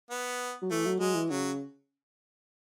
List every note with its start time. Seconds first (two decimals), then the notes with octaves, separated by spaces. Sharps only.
0.11 B3
0.62 F#3
0.71 E3 A3
0.86 F#3
1.00 F#3 G#3
1.15 E3
1.30 C#3 F#3